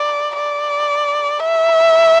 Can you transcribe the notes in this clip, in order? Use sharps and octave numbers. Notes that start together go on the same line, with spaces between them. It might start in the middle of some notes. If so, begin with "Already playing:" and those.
Already playing: D5
D5
E5